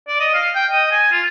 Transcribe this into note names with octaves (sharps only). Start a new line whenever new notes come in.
D5
D#5
F5
G5
D#5
G#5
F4